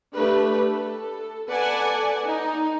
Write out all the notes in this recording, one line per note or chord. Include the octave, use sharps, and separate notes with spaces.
A3 D4 G4 B4
A4
A4 B4 D5 F#5 G#5 A5
D#4